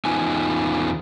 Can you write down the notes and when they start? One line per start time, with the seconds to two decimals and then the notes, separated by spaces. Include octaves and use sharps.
0.05 E2 B3 D#4 F4 G#5